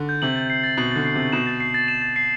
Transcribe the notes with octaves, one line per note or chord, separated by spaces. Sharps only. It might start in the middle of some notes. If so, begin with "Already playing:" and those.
Already playing: D3
G6
C3 F#7
A6
C7
A6
B2 F#7
D3 A6
C7
C3 A6
B2 E7
A6
C7
A6
E7
A6
C7